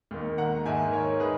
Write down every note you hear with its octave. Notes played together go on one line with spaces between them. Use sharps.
D#2 D#3
F#5 A#5
G#2 D#3 E5 G#5
A#4 C#5
D#3 G#4 B4